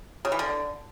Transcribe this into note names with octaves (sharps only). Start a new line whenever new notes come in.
C#3
E3
D3